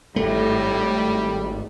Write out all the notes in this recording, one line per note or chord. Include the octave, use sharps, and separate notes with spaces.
G#1 A2 G3 A3